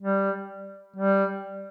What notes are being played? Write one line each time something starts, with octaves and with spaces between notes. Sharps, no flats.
G3
G3